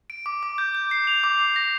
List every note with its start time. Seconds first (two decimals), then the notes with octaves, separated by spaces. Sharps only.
0.10 D7
0.26 D6
0.43 D6
0.58 G6
0.75 G6
0.91 C7
1.07 F7
1.24 D6
1.41 D6
1.56 A#6